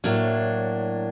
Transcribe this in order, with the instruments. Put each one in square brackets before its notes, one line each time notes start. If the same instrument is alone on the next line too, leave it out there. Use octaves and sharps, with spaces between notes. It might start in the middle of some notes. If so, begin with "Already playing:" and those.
[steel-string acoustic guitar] A2 F#3 A#3 D4